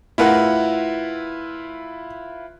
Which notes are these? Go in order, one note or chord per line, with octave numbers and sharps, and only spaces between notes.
A2 E4 F4 A#4 B4 F#5